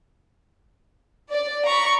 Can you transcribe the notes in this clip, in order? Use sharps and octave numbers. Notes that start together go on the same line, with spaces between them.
D5
A#5 B5 C#6